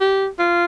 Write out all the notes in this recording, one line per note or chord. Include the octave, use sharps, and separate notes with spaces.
G4
F4